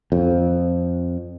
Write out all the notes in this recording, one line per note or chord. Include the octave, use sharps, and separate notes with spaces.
F2